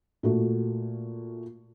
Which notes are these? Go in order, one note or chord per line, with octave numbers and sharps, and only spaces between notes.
A#2 A3 F#4